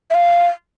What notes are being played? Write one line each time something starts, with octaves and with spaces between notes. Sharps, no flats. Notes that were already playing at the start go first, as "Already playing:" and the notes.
E5
F5